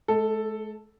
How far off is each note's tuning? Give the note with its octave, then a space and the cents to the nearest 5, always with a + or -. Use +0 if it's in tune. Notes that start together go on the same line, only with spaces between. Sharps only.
G#3 +45 A4 +0